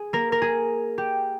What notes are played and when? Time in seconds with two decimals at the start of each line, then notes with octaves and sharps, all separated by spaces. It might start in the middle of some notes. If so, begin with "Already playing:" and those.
Already playing: G#4
0.13 A#3 A#4
0.32 A#4
0.42 G#4
0.98 G4